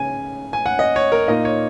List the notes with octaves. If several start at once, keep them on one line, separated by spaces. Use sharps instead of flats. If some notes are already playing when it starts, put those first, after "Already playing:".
Already playing: C#3 G#5
G#5
F#5
D#5
C#5
A#4
A#2 A#3 D#4 D#5
C#5